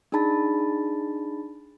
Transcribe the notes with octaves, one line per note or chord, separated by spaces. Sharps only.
D4 D#4 G#4 A5 B5 A6